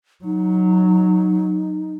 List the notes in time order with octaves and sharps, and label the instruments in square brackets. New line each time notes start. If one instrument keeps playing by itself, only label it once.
[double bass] F#3 [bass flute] D#4